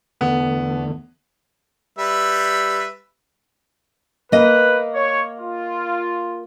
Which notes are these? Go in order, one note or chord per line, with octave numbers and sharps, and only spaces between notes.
E2 D3 A3 B3
G3 B4 E5
A#3 B4 D#5
C#5
F4